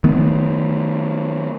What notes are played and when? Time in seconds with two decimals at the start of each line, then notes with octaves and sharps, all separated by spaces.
0.04 D#3 A3 B3